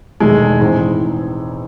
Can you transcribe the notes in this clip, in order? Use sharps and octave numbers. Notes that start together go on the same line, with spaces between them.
E1 E2 D#3 G#3 A3
A2 E3 C4 D#4 G#4